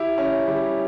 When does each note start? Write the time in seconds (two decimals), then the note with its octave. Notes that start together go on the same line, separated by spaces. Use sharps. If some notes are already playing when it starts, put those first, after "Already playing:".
Already playing: E4 G4
0.18 C#4
0.48 G3